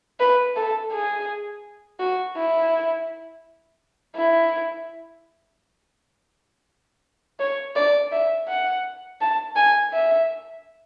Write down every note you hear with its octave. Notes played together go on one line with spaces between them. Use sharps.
B4
A4
G#4
F#4
E4
E4
C#5
D5
E5
F#5
A5
G#5
E5